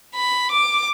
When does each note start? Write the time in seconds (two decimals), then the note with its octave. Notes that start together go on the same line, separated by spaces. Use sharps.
0.15 B5
0.52 D6